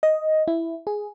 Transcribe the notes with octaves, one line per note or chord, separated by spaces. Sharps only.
D#5
E4
G#4